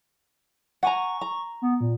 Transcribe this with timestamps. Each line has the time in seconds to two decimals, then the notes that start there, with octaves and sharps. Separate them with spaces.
0.83 F#5 G#5 A#5 C#6
1.21 A#5
1.62 B3
1.81 A#2